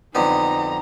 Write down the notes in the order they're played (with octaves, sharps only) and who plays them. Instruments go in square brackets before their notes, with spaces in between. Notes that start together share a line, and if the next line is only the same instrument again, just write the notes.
[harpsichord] F2 D3 B3 [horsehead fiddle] D#4 A#5